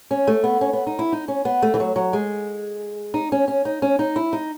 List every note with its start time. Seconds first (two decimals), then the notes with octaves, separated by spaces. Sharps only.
0.11 C#4
0.27 A3
0.44 B3
0.61 C#4
0.73 B3
0.87 D#4
0.99 E4
1.12 D#4
1.28 C#4
1.45 B3
1.62 A3
1.74 E3
1.80 F#3
1.96 F#3
2.13 G#3
3.14 D#4
3.32 C#4
3.48 C#4
3.65 D#4
3.82 C#4
3.99 D#4
4.16 E4
4.33 D#4